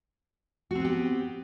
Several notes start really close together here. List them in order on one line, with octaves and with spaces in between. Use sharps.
F#4 C4 B3 G4